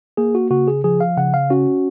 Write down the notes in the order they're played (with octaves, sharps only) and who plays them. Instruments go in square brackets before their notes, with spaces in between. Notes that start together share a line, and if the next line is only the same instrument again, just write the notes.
[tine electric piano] A#3 G#4
F#4
C#3 F#4
G#4
F3 G#4
F5
C#3 F#5
F5
C#4 F#4